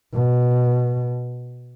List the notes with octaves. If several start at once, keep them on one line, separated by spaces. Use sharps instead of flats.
B2